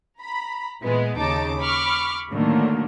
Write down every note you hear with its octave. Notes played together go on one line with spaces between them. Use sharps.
A#5 B5
A#2 E3 G#3 B3
D#2 C#3 D#4 A5 D6
B5 C#6 D6 F6
A2 D3 D#3 F#3 A3 A#3